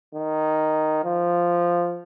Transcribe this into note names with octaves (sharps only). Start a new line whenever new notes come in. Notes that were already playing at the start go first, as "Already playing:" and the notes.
D#3
F3